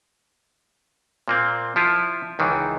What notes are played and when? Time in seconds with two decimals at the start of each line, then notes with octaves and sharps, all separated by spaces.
1.28 A#2 A#3 C4
1.76 F3 E4 F4
2.39 C#2 D#3 E3